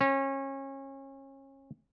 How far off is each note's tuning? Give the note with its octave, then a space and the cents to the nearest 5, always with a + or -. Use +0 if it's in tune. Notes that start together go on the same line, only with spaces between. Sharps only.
C#4 -30